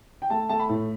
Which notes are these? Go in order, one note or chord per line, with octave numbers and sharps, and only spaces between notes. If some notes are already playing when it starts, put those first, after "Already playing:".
G5
A3 A5
A3 A5
B5
A2